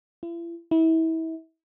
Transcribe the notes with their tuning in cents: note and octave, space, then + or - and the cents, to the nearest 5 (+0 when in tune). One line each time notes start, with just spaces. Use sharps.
E4 +40
E4 -30